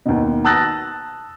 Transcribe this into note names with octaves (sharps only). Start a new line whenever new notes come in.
D#2 B2
A5 D#6 E6 F#6 A6 A#6